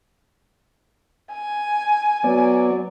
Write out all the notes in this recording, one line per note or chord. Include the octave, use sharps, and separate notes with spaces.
G#5
F#3 B3 D5